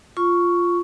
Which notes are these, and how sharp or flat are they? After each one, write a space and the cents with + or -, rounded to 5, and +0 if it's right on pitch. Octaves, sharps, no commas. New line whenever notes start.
F4 +0 C#6 +5